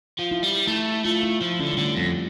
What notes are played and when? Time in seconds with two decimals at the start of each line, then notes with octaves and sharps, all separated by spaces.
0.19 F3
0.31 E4
0.44 G3
0.68 A3 E4
1.05 A3 F4
1.23 E4
1.41 F3
1.60 D3 C#4
1.73 G3
1.78 D3 A3
1.97 F2 G3